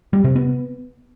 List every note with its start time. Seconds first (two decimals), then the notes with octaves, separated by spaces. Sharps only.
0.13 G3
0.24 C3
0.36 B3